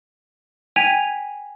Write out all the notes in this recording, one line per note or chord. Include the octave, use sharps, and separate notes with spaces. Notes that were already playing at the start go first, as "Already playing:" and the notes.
G5 G#5 G#6 B6 D#7 F7